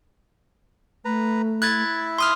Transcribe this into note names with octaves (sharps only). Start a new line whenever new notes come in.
A3 B4 A#5
E4 E5 F#6 G#6 A6
C6 D#6 F6